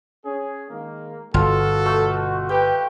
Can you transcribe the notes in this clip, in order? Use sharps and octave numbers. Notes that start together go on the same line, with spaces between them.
C#4 G#4
D#3 G#3 A#3
G1 B2 F4 F#4 A4
A3
G4 B4 G5